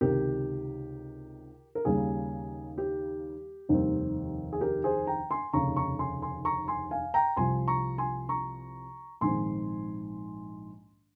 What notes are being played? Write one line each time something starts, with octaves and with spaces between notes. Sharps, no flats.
C#2 C3 D#3 G4 A#4
A#4
D#2 C#3 G3 A#3 G#4
G4
F1 D#2 D#3 G3 C4
G#4
G4 A#4
G#4 C5
G5 A#5
G#5 C6
F1 D#2 C#3 A#5 C#6
A#5 C#6
G#5 C6
G#5 C6
A#5 C#6
G#5 C6
F5 G#5
G5 A#5
C2 C3 F3 G#5 C6
A#5 C#6
G#5 C6
A#5 C#6
A#1 G#2 D#3 G#3 C4 G#5 C6